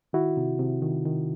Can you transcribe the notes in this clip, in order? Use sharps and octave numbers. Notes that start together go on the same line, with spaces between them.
D#3 E4 F#4
C3
C3
D#3
D#3